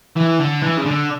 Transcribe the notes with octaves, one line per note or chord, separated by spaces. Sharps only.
E3
D3
E3
C#3
D3